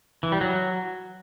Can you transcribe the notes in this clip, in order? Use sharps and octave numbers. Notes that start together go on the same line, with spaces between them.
E3
G3
F#3